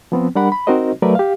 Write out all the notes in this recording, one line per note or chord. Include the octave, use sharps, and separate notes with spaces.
F3 B3 C4
G3 D4 A#4 F#5 B5
B5
C4 D#4 F#4 A#4 C5 D#5
F#3 A3 A#4 B4 D5 E5
G4 F5